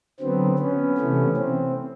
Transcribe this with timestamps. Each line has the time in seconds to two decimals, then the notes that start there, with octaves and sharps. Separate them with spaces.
0.20 D3 F#3 B3 C4
0.59 B3 C#4
0.98 C3 E3 A3
1.37 C4